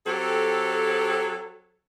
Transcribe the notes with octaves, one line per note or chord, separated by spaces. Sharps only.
F#3 C4 G4 A4